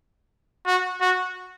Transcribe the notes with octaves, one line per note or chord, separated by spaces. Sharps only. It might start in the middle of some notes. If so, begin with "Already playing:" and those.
F#4
F#4